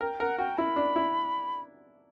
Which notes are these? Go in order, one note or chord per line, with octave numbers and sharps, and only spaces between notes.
A#4 G5
A#4 F#5
F#4 G5
E4 B5
D4
E4